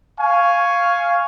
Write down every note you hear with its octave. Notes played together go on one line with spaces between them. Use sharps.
F5 G#5 C#6